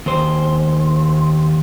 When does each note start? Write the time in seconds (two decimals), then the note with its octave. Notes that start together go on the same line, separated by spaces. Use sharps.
0.06 D#2 C5